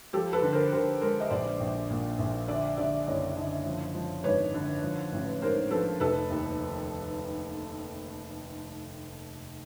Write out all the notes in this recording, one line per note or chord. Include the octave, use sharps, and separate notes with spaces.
F3 G4 A4
A4 B4
D3
A#4 C5
D3 A#4 C5
G#3 A#4 C5
D#5
A#1 C5 D5
A#1
A#2
A#1
D3 D5 E5
D3 D5 E5
F#1 C#5 D#5
D3
F3
F3
G#1 B4 C#5
D3
F3
A1
G#2 A#4 C5
F3 A4 B4
F1 A4 B4
D#2